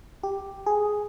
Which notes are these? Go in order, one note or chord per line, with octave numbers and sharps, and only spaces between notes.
G4
G#4